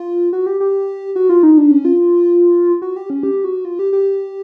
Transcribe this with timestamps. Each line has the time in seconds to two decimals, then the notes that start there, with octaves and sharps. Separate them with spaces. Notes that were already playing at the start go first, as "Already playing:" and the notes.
Already playing: F4
0.33 F#4
0.46 G4
0.60 G4
1.16 F#4
1.29 F4
1.43 D#4
1.58 D4
1.71 C#4
1.85 F4
2.82 F#4
2.96 G4
3.10 C#4
3.23 G4
3.44 F#4
3.65 F4
3.79 G4
3.93 G4